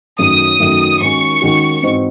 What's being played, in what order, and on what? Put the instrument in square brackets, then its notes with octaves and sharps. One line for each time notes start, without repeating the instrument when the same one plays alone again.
[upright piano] F#2 D#3 F#3 A3 [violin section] D#6
[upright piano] F#2 D#3 F#3 A3
[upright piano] D#2 D#3 G#3 C#4 F#4 [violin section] C#6
[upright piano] D#2 D#3 G#3 C#4 F#4
G#2 E3 C4 D#4 F#4